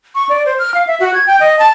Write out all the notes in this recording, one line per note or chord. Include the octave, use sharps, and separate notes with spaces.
C#6
D5
C5
F6
F5
E5
F#4
G#6
G5
D#5
A5